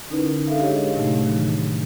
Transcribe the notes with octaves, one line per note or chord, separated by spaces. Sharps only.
D3 C#4 D#4 E4 A#4 B4
G#3 D4 A4 E5 F5
G4 G#4 C#5 D#5
A2 C3 F#3 A3 D#4
D#3 E3